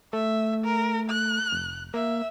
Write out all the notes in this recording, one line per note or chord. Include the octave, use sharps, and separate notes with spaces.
A3 E5
A#4
F#6
F1
A#3 E5